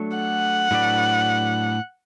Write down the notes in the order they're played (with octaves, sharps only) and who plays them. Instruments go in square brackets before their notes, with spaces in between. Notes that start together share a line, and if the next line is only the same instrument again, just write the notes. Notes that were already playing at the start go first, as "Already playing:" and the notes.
Already playing: [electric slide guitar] F#3 A3 D4 A4
[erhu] F#5
[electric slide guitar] A2 F#3 D4 B4 D5